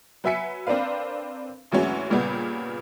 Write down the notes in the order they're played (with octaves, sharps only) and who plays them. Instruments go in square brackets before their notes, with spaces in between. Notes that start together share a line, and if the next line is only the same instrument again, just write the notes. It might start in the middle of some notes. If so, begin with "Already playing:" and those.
[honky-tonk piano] F#3 B4 E5 G#5 B6 C#7
C4 D4 A#4 B4 F5
G#1 D2 E3 F#3 G#3 C#4
G2 A#2 C#3 G3 B3